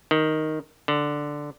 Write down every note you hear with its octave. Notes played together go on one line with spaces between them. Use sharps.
D#3
D3